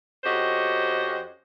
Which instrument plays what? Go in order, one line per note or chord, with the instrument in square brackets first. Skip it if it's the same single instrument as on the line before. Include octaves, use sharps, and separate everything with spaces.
[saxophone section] F2 C#4 F#4 G4 C5 D#5